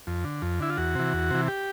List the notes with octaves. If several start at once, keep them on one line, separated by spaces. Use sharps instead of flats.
F2
D3
F2
D3 E4
F4
E2 F#4
C3 E3
E2
C3 E3
G4